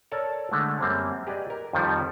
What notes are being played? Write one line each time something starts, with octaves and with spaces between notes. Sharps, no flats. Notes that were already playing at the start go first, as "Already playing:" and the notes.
A4 A#4 C#5 D5 A5
D3 G#3 A3
F#2 G3 A#3 C4
G4 G#4 B4 D5 D#5
A#4
F2 D#3 F3 G3